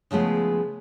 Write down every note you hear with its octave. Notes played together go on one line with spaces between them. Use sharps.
C#3 F3 G#3 A3 B3